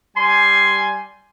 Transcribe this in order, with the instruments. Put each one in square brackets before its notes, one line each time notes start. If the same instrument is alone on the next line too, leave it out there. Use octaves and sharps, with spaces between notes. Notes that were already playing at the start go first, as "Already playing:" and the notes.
[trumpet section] G3 G#5 [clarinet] C6